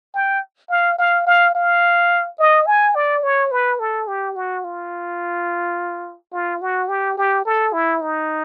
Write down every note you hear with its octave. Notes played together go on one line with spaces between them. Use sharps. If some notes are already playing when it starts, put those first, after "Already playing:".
G5
F5
F5
F5
F5
D#5
G#5
D5
C#5
B4
A4
G4
F#4
F4
F4
F#4
G4
G4
A4
E4
D#4